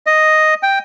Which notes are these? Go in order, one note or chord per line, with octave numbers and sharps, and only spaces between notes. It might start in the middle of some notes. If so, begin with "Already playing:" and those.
D#5
G5